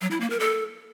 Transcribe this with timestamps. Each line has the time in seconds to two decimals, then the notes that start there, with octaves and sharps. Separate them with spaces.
0.01 F#3
0.11 E4
0.20 A#3
0.30 A#4
0.40 A4